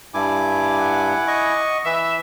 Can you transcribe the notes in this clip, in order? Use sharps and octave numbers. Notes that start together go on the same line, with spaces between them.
G2 E4 G#5 D6
F#5
D#5 C#6
E3 B4 E5